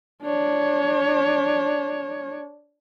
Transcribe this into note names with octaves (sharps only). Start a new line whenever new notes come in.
D4 C#5